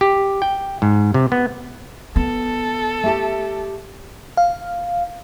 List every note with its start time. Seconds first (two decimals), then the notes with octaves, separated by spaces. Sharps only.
0.01 G4
0.42 G5
0.82 G#2
1.14 C3
1.32 B3
2.16 B3 A4
3.04 A3 G4 A5
4.37 F5